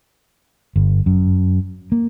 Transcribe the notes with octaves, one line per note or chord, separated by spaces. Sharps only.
G1
F#2
A#3